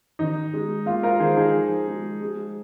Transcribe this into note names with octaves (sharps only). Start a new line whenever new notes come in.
D#3 D#4
G#3
A#3 F4
F4 A#4
D#3 G#4 C5
D#4 G#4
F3
G#3
G#3